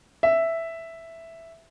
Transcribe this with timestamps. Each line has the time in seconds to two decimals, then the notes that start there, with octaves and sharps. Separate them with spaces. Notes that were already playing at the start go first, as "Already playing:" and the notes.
0.23 E5